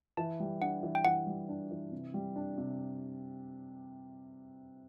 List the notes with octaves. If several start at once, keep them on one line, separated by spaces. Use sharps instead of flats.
E3 A5
G3
D4 F#5
E3
G5
E3 F#5
G3
D4
E3
C3
G3
D4
C3